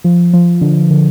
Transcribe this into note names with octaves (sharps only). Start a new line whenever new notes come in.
F3
F3
D3
D3